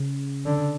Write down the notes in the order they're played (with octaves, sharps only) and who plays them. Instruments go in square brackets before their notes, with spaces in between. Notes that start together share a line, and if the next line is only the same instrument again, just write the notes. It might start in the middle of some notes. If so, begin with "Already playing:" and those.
Already playing: [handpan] C#3
[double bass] D3